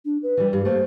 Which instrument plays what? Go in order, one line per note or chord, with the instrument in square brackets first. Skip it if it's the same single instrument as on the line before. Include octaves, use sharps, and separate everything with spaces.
[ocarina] D4
B4
[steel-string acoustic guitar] E3 G3
[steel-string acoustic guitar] G2 [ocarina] G4
[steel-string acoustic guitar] A3 A#3 [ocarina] C5